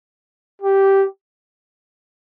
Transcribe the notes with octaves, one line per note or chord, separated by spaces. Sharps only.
G4